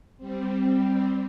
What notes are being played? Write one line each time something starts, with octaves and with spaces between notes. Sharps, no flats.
G3 C4